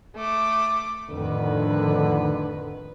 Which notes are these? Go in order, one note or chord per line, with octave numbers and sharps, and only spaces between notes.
A3 D6
F2 A2 D3 D#3 B4